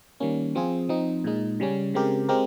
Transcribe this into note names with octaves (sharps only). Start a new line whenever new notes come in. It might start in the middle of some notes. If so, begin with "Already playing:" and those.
D#3 G3 A#3 C#4
F3 C4 F4 G#4
F3 C4 D#4
A#2 G#3 D#4
C#3 G3 C#4
C#3 G#3 C4 G4 A#4
G#3 C4 G4 A#4